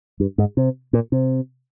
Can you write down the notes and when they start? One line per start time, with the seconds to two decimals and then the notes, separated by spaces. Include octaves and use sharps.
0.20 G2
0.38 G#2
0.57 C3
0.93 A#2
1.12 C3